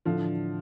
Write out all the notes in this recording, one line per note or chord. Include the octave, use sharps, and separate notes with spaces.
A2 D3 E3 F3 A3 D4 F4